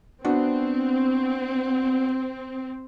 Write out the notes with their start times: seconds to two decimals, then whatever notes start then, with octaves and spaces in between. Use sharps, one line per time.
0.25 B3 C4 D4 F#4